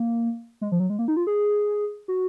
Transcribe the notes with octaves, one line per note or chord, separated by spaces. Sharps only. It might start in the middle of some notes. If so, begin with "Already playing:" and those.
Already playing: A#3
G#3
F3
F#3
G#3
A#3
D#4
F4
G#4
F#4